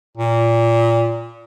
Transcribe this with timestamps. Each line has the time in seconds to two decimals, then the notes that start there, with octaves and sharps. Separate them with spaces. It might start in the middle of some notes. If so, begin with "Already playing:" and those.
0.17 A#2